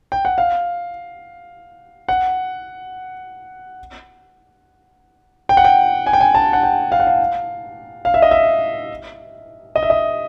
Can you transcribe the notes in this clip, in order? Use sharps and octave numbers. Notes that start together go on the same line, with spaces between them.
G5
F#5
F5
F#5
G5
F#5
G5
G#5
G5
G#5
A5
F#5
G5
F5
F#5
F5
F5
E5
D#5
E5
D#5
E5
D#5